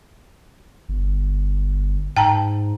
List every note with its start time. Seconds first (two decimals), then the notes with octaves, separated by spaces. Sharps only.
0.89 G1
2.17 G#2 G5 A5 A#5